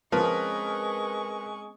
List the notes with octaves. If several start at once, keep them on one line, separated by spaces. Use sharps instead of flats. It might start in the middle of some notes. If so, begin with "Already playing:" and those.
F3 G#3 C4 C#4 A#4 B4 C#6